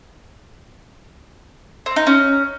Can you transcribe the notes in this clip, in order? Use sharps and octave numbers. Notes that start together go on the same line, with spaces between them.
C4
D#4
C#4